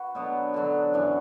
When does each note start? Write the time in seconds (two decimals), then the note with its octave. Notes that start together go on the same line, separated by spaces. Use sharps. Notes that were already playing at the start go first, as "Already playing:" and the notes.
Already playing: F#4 B4
0.15 B2 F#3 B3 D4
0.54 D3 F#3 D4
0.94 F#2 E3 D4 F#4